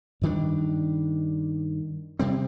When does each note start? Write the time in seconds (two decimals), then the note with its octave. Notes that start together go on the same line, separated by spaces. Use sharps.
0.21 G2 D#3 G3 D4
2.19 C3 G3 C4